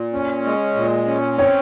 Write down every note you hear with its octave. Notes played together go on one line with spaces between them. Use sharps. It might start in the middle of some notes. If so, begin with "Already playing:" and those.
Already playing: A#2
C#4
G#3
A#2
C#4
C4 C#5